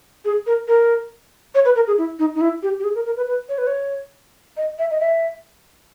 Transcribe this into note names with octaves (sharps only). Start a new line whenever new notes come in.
G#4
A#4
A#4
C#5
B4
A#4
G#4
E4
D#4
D#4
E4
G4
G4
G#4
A#4
A#4
B4
B4
C#5
B4
C#5
D#5
E5
D#5
E5